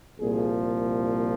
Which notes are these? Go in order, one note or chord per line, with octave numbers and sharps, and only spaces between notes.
C2 A#2 F3 G#4